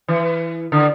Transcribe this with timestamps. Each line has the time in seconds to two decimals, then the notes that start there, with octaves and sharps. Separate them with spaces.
0.08 E3
0.72 D3